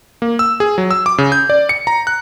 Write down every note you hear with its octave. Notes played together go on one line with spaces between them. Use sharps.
A#3
E6
G#4
F#3
E6
D6
C#3
G6
D5
C#7
A#5
F#6